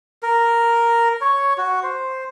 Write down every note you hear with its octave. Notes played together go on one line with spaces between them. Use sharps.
A#4
C#5
F#4
C5